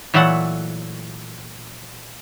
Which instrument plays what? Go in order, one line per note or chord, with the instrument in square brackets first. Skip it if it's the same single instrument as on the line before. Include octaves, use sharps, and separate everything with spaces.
[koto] A#2 E3 F#3 A3 A4 F#5